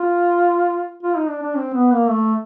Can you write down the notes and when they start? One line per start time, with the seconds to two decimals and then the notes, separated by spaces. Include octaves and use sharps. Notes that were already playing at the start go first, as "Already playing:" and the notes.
Already playing: F4
1.03 F4
1.16 D#4
1.29 D4
1.42 D4
1.57 C4
1.74 B3
1.92 A#3
2.10 A3